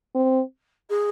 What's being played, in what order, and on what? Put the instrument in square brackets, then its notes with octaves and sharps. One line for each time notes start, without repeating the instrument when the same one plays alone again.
[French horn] C4
[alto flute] G#4